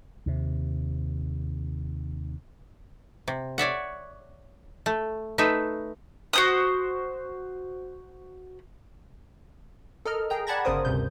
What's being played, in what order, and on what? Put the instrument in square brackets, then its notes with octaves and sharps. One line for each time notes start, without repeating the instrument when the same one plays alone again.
[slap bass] D#2 C3
[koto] C3
C#5 D5 E5 F#5
A3
A3 D#4 B4 E5
[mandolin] F#4 C5 D#6
[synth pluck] A4 A#4 D#5 F6
G#4 G5 A#5
D5 F#5 A5 B5 G#6 A#6
G1 C#3 A#4 C5 D#6
D2 G2 C3 G6